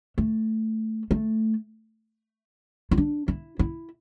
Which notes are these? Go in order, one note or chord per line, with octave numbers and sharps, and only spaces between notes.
A3
A3
E4
D4
E4
E4